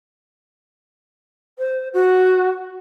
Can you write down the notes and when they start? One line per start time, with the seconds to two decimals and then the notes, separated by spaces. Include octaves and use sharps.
1.58 C5
1.93 F#4